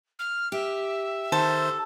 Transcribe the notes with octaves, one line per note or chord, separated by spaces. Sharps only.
F6
G4 E5
D#3 A4 C5